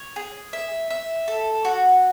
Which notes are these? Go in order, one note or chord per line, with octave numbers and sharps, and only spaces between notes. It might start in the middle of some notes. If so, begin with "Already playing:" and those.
Already playing: C#5
G#4
E5
E5
A4
F#4